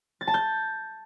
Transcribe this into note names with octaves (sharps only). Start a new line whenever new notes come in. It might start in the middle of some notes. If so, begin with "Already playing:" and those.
A6
A5
G6